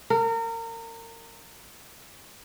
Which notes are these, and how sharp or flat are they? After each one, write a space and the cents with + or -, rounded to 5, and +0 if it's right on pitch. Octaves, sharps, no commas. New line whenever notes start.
A#4 -30